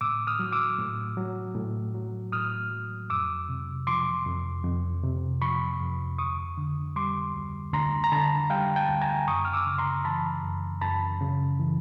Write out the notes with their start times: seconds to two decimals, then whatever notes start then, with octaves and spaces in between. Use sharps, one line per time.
0.01 A2 D6 E6
0.27 D#6 F6
0.39 F#3
0.52 D6 E6
0.78 A2
1.17 F#3
1.55 A2
1.94 F#3
2.32 A2 D#6 F6
2.71 F#3
3.10 F2 D6 E6
3.49 C3
3.87 F3 C6 D6
4.26 F2
4.64 F2
5.03 C3
5.42 F3 B5 C#6
5.80 F2
6.18 D2 C#6 D#6
6.57 D3
6.96 G3 C6 D6
7.35 D2
7.73 D2 A#5 C6
8.04 A#5
8.12 D3 A5 B5
8.50 G3 F5 G5
8.76 G5 A5
8.89 D2
9.02 G#5 A#5
9.27 F#2 C#6 D#6
9.45 F6
9.53 D6 E6
9.66 C#3
9.78 A#5 C6
10.04 E3 A5 B5
10.43 F#2
10.81 F#2 A5 B5
11.21 C#3
11.59 E3